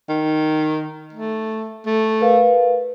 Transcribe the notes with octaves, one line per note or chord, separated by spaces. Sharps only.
D#3
A3
A3
A#4 B4 F5